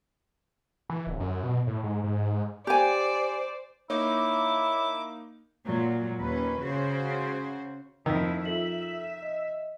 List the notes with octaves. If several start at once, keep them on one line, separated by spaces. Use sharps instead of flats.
E3
D1
F#2
B2
A2
G#2
G#2
G4 C5 D5 G#5
A#3 D#4 E4 C#5 D6
A#2 F#3
D#2 C#4 B4
C#3 F#4 C5
F2 D#3 E4 E6 B6
F4 A4 E5 F#7
D#5